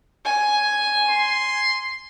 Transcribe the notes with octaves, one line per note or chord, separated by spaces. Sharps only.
G#5
C6